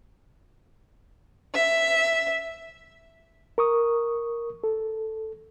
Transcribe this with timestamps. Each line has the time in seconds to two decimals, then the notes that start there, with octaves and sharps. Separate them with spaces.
1.55 E5
3.58 A#4 C#6 D#6
4.64 A4